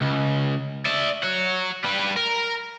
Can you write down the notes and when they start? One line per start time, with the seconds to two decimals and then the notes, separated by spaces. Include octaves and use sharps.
0.02 C#2
0.86 D5 E5
1.24 C#5 F#5
1.84 G3 B4
2.16 A#4